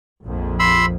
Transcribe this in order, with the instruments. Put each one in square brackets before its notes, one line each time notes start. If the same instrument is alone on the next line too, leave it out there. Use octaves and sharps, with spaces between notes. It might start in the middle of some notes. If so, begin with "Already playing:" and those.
[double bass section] A#1 F2
[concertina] B5 C6 E6